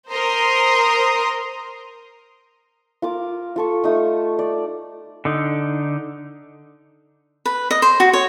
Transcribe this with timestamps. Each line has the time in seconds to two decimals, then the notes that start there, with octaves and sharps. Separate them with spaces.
0.11 A#4 C5 A#5 C6 D#6
3.02 F4 A#4 D6
3.56 F4 A4 C#6
3.84 A3 D#4 D#6
4.39 D5
5.25 D3 D#4
7.45 B4
7.71 D#5
7.82 C5
8.00 F#4
8.13 C#5